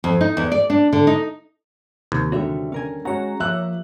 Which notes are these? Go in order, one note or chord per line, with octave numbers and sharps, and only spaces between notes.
F2
D#4
E2
D5
D4
D3
D#4
D#2 C3
D3 G3 F#4 C#5 E5
C#4 A#4 G#5
G#3 C#4 F#4 C#5 A#5
F3 A#3 G4 E5 E6 F#6